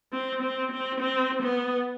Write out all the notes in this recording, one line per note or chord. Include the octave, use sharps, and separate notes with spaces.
C4
C4
C4
C4
B3